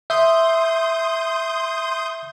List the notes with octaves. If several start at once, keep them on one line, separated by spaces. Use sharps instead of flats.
E5 C6 D#6 G6